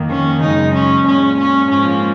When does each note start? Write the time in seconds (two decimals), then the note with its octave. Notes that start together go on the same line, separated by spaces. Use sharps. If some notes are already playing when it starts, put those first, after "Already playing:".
Already playing: F2 D#3 A#3
0.10 C#4
0.42 F#2 C#3 G#3 D#4
0.75 C#4
1.06 A#2 G#3 C#4
1.38 C#4
1.70 G#2 F3 A#3 C#4